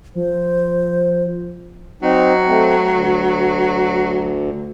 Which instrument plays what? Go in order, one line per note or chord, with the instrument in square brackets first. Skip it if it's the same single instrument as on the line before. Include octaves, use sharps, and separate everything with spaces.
[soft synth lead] F3 [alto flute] C5
[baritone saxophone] F#3 [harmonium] C4 D#4
[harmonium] A3 C4
D2